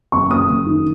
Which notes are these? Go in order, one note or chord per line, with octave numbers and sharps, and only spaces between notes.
F#1 C#6
F#1 D#6
F#1
D#3